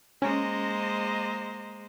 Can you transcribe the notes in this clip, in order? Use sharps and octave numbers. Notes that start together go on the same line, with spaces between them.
G#3 A#3 C#4 C5 D#5 A#5